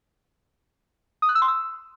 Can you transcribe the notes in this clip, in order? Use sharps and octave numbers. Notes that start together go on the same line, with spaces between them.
D#6
F#6
E6
C6
E6